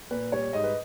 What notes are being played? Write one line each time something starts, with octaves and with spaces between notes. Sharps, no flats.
A#2 B4
G3 C#5
G#2 D#5
B4